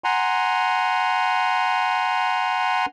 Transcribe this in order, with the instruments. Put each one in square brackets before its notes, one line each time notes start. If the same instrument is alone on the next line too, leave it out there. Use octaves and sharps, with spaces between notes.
[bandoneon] F#5 G#5 A#5 C6